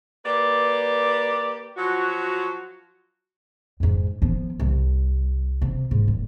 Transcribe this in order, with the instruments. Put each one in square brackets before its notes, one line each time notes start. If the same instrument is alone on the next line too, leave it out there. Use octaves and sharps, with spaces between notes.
[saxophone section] A#3 G4 B4 D5
F3 F#3 F#4
[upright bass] F2 G#2
F3 B3
C2
C3
G#2
D#1